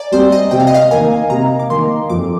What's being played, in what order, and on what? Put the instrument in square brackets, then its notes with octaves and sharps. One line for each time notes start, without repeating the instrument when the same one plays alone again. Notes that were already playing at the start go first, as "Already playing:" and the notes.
Already playing: [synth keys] D5 G#5 A#5
[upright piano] G3 C4 [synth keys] C5
[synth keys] D#5
[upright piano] C3 [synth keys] G5
[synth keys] F5
D#5
F5
[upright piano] D#3 A#3 [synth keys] G#5
[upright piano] C3 [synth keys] A#5
[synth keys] D6
[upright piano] D#3 A#3 [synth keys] C6
[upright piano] F2 [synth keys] D6